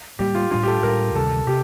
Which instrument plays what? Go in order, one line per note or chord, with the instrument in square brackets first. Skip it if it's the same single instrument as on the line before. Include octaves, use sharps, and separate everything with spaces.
[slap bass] A2 G3 A#3 [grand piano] G4
[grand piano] F4
[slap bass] A2 G3 D4 [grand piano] F4
[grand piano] G4
A4
[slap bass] A2 G3 D4 [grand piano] A#4
[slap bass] D2 C3 D#3 G3 [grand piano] A4
[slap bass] C3 [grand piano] G4